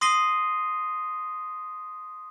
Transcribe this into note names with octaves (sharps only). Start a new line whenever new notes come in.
C6 D#6 A#6 C7 D#7 G7